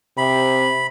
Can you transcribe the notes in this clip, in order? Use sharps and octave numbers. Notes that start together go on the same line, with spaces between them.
C3 B5